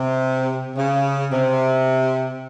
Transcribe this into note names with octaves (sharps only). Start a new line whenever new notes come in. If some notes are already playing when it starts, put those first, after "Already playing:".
Already playing: C3
C#3
C3